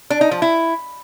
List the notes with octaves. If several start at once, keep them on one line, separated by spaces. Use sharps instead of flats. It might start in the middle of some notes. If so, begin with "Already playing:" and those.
D4
D#4
F3
E4